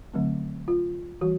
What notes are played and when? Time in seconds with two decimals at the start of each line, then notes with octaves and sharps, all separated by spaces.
0.13 D3 F#3 A3 C4
0.68 F4
1.21 E3 G3 F#4